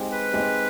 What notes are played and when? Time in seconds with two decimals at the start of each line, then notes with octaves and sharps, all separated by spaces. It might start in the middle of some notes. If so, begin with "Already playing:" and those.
Already playing: G#3 C4 D#4 G4
0.12 B4
0.33 G#3 C4 D#4 G4